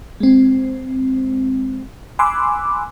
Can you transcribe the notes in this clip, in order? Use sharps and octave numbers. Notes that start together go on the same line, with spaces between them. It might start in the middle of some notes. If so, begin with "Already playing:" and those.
G#3 C4
G#5 B5 C6 D6 E6 F#6